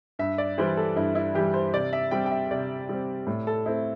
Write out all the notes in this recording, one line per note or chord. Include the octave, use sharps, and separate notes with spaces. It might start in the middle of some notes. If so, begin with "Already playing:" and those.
G2 E5
D5
E3 G3 C5
A4
G2 E4
E4
E3 G3 G4
C5
C3 D5
E5
G3 C4 G5
G5
E5
C3 D5
G3 C4
A2
A4
A3 C4 E4